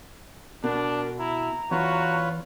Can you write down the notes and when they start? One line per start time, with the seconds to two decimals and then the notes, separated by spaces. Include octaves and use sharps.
0.64 B2 D4 A#4
1.19 E4 A#5
1.71 E2 F4 F#4 B4 C#5